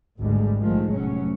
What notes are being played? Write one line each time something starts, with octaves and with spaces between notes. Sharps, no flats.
G#1 D2 G3 G#3
A#1 D#3 F3 G#3 A3
F1 A2 F#3 C#4